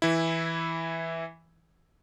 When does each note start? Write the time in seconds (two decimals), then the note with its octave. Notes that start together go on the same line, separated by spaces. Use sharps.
0.02 E3 E4